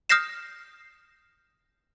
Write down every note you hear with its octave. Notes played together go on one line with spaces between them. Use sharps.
D#6 F6 G6 A#6 C7 E7